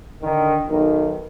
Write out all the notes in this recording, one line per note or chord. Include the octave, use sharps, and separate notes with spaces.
D3 D#3
B1 D#3